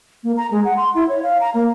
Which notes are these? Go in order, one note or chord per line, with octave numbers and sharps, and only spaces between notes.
A#3
A#5
G#3
F#5
C6
E4
C#5
F5
A#5
A#3